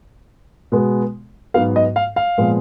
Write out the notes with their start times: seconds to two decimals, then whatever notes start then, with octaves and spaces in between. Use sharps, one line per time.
0.72 B2 G#3 B3
1.54 G#2 F#3 B3 F5
1.76 D#5
1.96 F5
2.16 F5
2.38 A#2 F3 G#3 B3